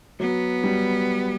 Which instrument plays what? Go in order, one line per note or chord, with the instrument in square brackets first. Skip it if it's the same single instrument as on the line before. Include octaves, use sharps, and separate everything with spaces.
[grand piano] F#3 [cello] B3
[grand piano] G3